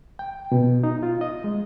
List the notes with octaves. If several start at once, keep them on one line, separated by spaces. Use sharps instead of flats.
G5
B2
D#4
F4
D#5
G#3